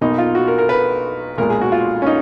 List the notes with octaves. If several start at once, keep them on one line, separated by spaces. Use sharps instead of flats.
B1 B2 A#3 D#4
F4
F#4
A#4
A#4
B4
B1 A#2 G#3 A#4
G#4
F#4
F4
C#4
D#4